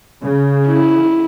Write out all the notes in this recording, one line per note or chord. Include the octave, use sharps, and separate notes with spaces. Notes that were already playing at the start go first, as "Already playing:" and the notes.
C#3
E4